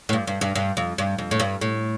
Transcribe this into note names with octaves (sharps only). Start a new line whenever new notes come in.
A2
G2
G2
G2
G2
F2
G2
F2
A2
G2
A2